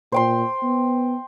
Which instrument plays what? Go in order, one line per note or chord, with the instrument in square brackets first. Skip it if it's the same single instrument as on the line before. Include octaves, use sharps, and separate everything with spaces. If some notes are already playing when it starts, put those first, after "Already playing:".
[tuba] A#2 [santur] C5 G5 C6
[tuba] B3